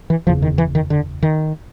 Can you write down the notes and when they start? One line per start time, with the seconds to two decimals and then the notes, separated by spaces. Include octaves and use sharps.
0.10 E3
0.26 F#1 E2 C#3 F3
0.42 D#3
0.58 E3
0.75 D#3
0.90 D3
1.23 D#3